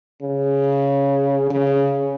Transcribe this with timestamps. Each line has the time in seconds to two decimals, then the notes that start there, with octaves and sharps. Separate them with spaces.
0.22 C#3
1.50 C#3